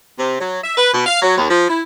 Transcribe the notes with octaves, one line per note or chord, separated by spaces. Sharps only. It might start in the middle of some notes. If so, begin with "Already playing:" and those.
C3
F#3
E5
B4
B2
F5
F#3
D#2
F3
E4